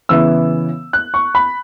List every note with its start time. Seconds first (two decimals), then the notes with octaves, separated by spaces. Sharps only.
0.09 C#3 E3 B3 E4 E6
0.93 F#6
1.14 C#6
1.35 B5